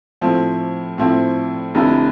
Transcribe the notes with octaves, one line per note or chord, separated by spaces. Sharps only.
A2 F3 C4 E4
A2 F3 C4 E4
F1 F2 D3 A3 E4